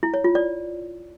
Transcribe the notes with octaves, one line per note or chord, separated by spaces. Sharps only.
E4
C#5
F4
D5